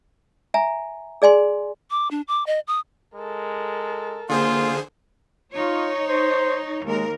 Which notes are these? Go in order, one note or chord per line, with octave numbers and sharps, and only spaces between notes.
E5 G#5 A#5
G#4 D5 G#5 C6
D6
D4
D6
D#5
D#6
G#3 A4 A#4
D3 A#3 F4 G#4 C5
D#4 F4 C#5
C5
D#2 G#3 A#4